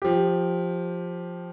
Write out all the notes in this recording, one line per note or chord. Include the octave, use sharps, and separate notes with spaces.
F3 G4